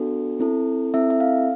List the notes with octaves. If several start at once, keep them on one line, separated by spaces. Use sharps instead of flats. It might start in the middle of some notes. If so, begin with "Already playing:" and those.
Already playing: B3 D4 F#4 A4
C4 E4 A4
C4 E4 A4 E5
E5
F5